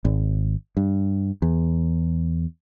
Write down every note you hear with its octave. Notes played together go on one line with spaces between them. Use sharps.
G#1
G2
E2